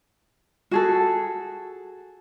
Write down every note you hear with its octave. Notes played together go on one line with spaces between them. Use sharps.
F#4 G#4 A4